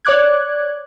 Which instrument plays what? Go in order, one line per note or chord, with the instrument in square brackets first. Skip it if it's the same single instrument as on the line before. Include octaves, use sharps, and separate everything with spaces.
[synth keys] C#5 D5 D6 F#6 G#6